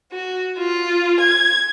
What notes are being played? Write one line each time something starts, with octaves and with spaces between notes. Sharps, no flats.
F#4
F4
G#6